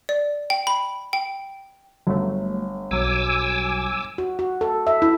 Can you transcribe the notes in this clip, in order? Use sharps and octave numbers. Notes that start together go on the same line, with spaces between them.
D5
G5
B5
G5
G1 F#3 A3
B1 F#3 G#5 D6 E6
F#4
F#4
A4
E5
E4